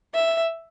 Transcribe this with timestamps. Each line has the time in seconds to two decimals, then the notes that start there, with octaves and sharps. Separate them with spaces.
0.14 E5